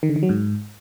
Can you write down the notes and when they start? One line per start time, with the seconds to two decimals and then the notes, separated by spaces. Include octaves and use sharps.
0.03 D#3
0.10 D3
0.16 D#3
0.23 F#3
0.29 G#2